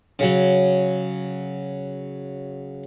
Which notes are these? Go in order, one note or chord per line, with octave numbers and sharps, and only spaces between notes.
C#3 F#3